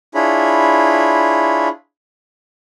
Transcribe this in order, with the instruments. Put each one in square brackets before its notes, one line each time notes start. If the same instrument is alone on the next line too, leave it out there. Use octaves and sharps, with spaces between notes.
[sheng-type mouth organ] D4 E4 F4 G#4 C#5 B5